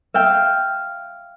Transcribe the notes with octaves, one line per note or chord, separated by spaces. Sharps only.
E5 F5 G5